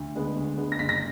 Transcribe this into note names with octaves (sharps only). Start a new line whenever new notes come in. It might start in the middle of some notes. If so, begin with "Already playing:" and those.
Already playing: D2
D3 G#3 B3
D2
D3 G#3 B3
A#6
F#1 B6
A#6